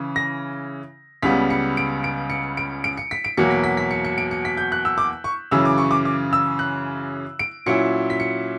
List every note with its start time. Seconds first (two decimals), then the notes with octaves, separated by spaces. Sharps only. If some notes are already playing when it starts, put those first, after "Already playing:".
Already playing: C#3 E3
0.16 A#6
1.22 C#2 C#3 G3 B3 B6
1.50 C#7
1.77 D7
2.04 D7
2.30 C#7
2.57 D7
2.84 D7
2.97 C#7
3.11 B6
3.24 D7
3.37 E2 B2 F#3 A#3 C#7
3.51 B6
3.64 B6
3.77 B6
3.91 C#7
4.05 C#7
4.18 D7
4.31 C#7
4.45 B6
4.57 G6
4.72 F#6
4.85 E6
4.98 D6
5.24 C#6
5.51 F#2 C#3 E3 E6
5.65 D6
5.78 C#6
5.91 D6
6.05 D6
6.33 E6
6.59 F#6
7.39 D7
7.66 A#2 F#3 C#4 E4 C#7
8.10 B6
8.20 C#7